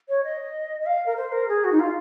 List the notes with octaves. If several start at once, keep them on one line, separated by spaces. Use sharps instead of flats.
C#5
D#5
D#5
F5
A#4
C5
A#4
G#4
F#4
D#4
F4